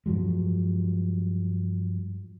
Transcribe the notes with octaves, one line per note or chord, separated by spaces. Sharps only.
G2 F3 F#3 G#3